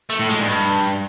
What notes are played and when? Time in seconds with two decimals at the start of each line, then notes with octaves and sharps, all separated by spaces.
0.10 A3
0.19 A2
0.29 G#3
0.39 G2